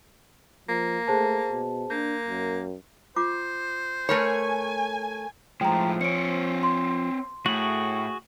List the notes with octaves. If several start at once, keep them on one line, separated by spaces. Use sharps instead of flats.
F3 A#3
A3 G#4 C5 A5
B2
A#3 D4 G6
F#2
F4 C5 D6
A3 A#4 B4 C#5 G#5 B5
A2 F3 G#3 G5 A#5
C4 C#5 C#7 D7
C6
A2 F#4 G#4 F#7